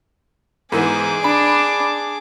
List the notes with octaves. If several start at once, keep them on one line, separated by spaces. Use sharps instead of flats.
G#2 E3 B3 G#4 D6
D4 B5